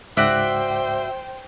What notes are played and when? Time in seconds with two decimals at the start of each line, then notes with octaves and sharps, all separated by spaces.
0.17 C#2 G#2 F#4 C5 D5 E5 G5 D6